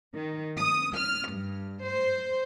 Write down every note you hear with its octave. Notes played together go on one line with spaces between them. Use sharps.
D#3
D#6
F6
G2
C5